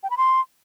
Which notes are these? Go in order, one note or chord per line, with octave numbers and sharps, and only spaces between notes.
G5
B5
C6